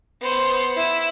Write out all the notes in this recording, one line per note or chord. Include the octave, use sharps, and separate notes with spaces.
B3 C5
E4 E7